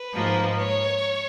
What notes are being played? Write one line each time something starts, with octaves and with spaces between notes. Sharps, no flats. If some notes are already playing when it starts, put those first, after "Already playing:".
Already playing: B4
G#2 F3 A#3
C#5